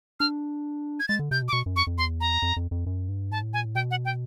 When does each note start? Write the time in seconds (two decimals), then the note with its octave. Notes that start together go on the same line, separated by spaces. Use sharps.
0.20 D4 F6
1.00 G#6
1.08 G#3 A6
1.19 D3
1.31 C3 G6
1.42 B2
1.48 D6
1.53 B2 C#6
1.66 F#2
1.76 F2 C#6
1.87 F2
1.98 E2 C6
2.20 A#5
2.42 F2
2.56 F2
2.71 F2
2.86 F#2
3.09 G2
3.31 G#2 A5
3.42 A2
3.53 A#2 G#5
3.65 A2
3.75 B2 G5
3.91 F#5
4.05 G5